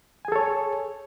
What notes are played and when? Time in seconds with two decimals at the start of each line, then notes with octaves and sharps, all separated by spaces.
0.25 G#5
0.28 G#4
0.32 A4
0.36 C#5